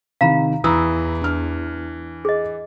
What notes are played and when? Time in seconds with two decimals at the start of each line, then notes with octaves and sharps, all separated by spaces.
0.21 C3 D#3 F5 A#5 B5
0.64 E2 E3 A#5 B5 D#6 E6
1.21 D4 F6
2.25 G#4 D#5